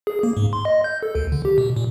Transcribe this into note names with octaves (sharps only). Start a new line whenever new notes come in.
G#4
A#3
G#2
C6
D#5
G6
A4
D2
D3
G4
B2
A#2